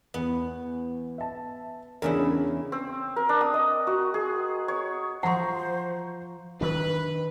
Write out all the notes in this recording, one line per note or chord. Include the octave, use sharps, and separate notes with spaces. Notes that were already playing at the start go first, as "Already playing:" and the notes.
E2 B3
E5 A5
E2 C#3 C#4 D4 E4 A#4
C4
A#4
D4
D#6
D#5
F#4
G#4
C#5
F3 C5 F#5 A#5 C6 C#6
D#3 D4 B4